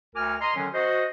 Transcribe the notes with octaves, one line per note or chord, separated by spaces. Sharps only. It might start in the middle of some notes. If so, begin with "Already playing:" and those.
D2 A#4 G#5 D6 F6
D#5 A#5 C6
D3 D#3 F#3 C#4
F#4 C5 D#5